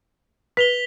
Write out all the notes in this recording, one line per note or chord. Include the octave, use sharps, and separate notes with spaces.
B4 B6 F7 G7